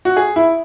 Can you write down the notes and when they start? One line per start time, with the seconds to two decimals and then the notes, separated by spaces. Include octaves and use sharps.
0.05 F#4
0.17 G#4
0.36 E4